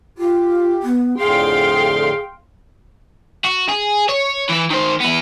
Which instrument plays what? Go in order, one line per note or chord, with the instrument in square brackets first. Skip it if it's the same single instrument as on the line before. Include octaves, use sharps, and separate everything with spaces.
[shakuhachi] F4 [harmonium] G4
[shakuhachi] B3
[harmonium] F2 A2 D3 [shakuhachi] G#4 [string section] F5 G5 C6
[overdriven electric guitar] F#4
G#4
C#5
E3 E4
D#3 C5
B3 E4